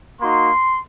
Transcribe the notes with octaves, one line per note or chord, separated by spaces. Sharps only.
A#3 D#4 F#4 C6